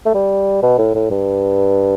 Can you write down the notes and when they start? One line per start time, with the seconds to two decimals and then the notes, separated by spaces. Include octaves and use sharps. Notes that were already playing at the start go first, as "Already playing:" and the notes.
0.06 A3
0.14 G3
0.62 B2
0.78 A2
0.95 A2
1.10 G2